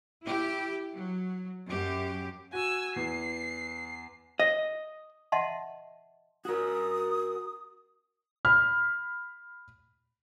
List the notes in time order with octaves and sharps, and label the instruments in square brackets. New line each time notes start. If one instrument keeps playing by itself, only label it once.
[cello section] E4 G4
F#3
F#2 G4
[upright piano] F#4 [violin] G#5 E6
[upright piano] E2 [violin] C7
[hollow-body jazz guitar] D#5
[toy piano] D#5 E5 F#5 A5 C6
[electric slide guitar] F#4 A#4 [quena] D#6
[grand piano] B5 F6